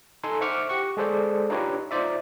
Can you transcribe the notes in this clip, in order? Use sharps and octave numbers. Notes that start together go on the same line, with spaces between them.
D#4 A4 G#5 C6
C5 E5 F#5 C#6 D6 F6
G4 F#5 C#6
G#3 G#4 A4 C5 D5
D4 D#4 F4 G4 B4 C#5
D#4 F4 C5 D5 E5